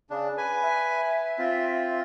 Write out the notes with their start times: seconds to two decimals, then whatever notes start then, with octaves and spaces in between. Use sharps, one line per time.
0.10 C#3 D4
0.38 B4 G#5
0.63 E5
1.39 C4 F4